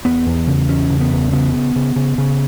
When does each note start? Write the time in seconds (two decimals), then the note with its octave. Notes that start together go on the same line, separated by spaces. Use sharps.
0.05 E2 B3
0.26 E2
0.47 C#3
0.69 E2 C#4
0.90 C#3
1.01 B3
1.11 E2
1.32 C#3 B3
1.54 C#3
1.76 C#3
1.96 C#3
2.18 C#3